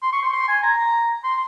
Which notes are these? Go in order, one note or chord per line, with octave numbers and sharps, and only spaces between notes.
C6
C#6
C6
C6
G#5
A#5
C6